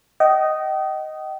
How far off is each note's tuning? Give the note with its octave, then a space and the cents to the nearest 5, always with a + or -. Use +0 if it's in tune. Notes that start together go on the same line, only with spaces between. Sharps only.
D#5 +0 G5 -40